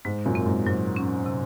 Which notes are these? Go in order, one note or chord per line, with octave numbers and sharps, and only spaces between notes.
G#2 G#3
F#2 A#2
C4
G#2
G#2 F#3
C#4
C3